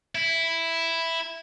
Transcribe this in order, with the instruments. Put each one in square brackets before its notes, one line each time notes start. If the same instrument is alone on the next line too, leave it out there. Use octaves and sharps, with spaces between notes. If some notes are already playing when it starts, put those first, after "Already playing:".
[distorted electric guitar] E4